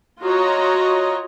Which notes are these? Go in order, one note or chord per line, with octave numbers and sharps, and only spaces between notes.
F4 F#4 C#5 D#5 A#5